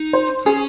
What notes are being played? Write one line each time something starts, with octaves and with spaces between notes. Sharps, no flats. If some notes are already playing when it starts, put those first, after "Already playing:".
Already playing: D#4
C5
C#4 G#4